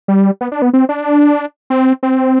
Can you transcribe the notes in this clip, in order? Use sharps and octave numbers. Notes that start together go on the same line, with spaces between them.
G3
B3
D4
B3
C4
D4
C4
C4